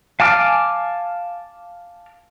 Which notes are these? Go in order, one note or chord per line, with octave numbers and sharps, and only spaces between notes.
F5 G#5 A5 D6 F6